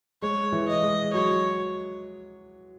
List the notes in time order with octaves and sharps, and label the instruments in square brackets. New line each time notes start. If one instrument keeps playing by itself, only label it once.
[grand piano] G#3 [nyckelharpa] C#5
[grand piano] E3
[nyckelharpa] D#5
[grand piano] G#3
[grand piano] F#3 [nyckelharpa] C#5